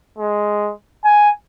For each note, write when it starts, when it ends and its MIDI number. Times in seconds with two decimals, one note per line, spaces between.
0.18 0.72 56
1.04 1.30 80